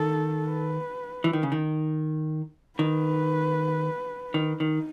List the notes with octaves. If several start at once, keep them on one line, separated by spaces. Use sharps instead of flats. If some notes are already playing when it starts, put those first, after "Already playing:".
Already playing: D#3 A4
B4
E3
D#3
C#3
D#3
D#3 B4
D#3 D#4
D#3